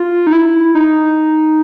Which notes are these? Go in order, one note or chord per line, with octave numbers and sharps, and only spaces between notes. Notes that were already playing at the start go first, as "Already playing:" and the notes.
Already playing: F4
D#4
E4
D#4